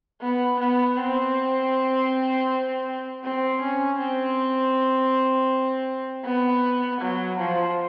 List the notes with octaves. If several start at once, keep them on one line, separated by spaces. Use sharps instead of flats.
B3
B3
C4
C4
C#4
C4
B3
F#3
F3